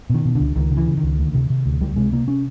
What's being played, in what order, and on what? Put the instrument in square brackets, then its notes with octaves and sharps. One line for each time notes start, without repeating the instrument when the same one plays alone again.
[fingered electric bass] B2 D#3
B2
C#2 D3
C#2 D#3
C#3
E3
C#3
D#3
C#2
D2
C3
C3
D2
C#2 G3
C3 G#3
C3 A#3
C#4